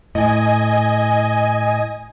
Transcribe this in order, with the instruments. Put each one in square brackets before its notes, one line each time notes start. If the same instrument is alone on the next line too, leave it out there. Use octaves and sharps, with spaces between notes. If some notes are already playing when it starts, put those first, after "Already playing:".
[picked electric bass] A2 [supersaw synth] D#5 G#5